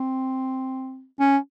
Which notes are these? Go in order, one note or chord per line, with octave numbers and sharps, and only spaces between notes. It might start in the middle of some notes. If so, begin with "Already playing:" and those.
Already playing: C4
C#4